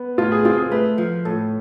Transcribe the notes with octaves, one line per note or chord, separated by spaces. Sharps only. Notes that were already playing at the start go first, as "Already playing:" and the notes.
Already playing: B3
A2 F4
G#4
C4 F4
G#4
A3 B4
F3
A2 A4